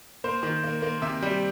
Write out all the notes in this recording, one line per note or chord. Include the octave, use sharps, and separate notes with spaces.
A#3 C5
D#3
A#3
A#3
C3 E5
G3